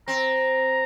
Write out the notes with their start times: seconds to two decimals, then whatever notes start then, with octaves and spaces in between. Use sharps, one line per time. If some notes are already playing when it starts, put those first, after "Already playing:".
0.08 C4 A#5